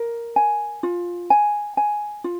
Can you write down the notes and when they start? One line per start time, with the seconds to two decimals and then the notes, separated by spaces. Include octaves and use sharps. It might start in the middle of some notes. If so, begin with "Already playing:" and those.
Already playing: A#4
0.36 G#5
0.83 F4
1.30 G#5
1.77 G#5
2.24 F4